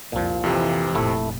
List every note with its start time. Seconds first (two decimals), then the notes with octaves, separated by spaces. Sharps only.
0.12 C2 F2 A#2 F3
0.44 F2 C3 E3
0.95 F1 A#2 A3 E4